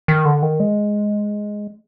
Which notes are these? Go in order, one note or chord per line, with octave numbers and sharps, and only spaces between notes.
D#3
D3
D#3
G#3